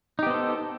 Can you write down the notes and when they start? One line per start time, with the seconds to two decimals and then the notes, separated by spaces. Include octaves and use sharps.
0.19 D#4
0.23 G4
0.27 B3
0.30 C5
0.34 A4